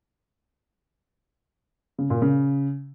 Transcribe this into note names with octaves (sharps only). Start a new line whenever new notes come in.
C#3
A#2
C#3